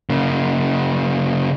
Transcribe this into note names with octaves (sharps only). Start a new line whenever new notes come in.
C#3 A#3